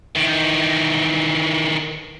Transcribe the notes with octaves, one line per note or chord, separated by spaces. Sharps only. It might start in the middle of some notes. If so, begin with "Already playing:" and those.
D#3 E3